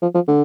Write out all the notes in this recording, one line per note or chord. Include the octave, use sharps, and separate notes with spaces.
F3
F3
D3